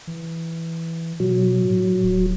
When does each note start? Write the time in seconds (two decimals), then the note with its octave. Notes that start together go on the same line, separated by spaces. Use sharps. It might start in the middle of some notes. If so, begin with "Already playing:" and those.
0.07 E3
1.20 B2 F#3
1.64 A2
2.03 D1